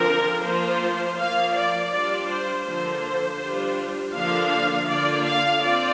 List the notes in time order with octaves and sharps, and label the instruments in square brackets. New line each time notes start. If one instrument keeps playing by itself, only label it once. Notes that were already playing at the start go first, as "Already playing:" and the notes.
Already playing: [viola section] D3 F3 C4 F4 A#4
F3 A#3 F4 C5
F3 A#3 F4 F5
D5
G3 D4 F4 D5
C5
D3 F3 A#3 C5
G3 D4 F4
D3 F3 A#3 D4 F4 F5
D3 A#3 D4 F4 D5
F5
C4 F4 D5